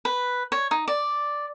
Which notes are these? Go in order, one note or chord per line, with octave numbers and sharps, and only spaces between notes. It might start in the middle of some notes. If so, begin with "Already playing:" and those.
B4
C#5
D#4
D5